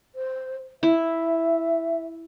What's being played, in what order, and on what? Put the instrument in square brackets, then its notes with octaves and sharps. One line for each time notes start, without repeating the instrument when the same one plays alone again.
[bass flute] C5
[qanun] E4 [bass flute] E5